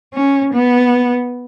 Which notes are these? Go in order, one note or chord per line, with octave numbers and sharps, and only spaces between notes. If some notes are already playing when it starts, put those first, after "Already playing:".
C#4
B3